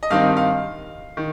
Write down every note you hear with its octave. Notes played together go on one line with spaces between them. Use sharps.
D#5
G2 D#3 C4 D#4 F5
F5
D#3